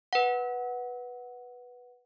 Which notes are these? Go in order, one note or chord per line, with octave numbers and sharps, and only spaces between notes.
B4 F#5